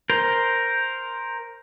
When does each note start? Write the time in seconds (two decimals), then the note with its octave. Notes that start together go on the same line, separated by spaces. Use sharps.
0.10 A#4 C5